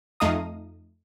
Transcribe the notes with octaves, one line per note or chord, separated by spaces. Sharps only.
F2 A3 D#4 F5 A#5 D#6